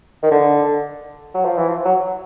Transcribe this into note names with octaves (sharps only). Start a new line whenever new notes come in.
D#3
D3
F#3
F3
E3
F3
F#3